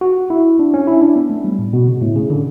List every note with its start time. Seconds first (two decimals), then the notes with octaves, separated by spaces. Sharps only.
0.01 F#4
0.30 E4
0.59 D4
0.74 C#4
0.87 E4
1.02 D4
1.16 B3
1.30 A3
1.44 G3
1.59 A2
1.73 B2
1.87 C#3
2.02 A2
2.15 C#3
2.30 D3